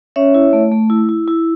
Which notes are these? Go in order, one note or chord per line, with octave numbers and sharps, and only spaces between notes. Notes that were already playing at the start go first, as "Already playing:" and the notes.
C#4 C#5 E5
E4
A3
A3
E4
E4
E4